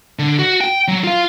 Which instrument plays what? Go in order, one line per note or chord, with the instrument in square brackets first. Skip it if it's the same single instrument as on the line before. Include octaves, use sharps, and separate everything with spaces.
[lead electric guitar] D3
F#4
G5
F#3
F4 F5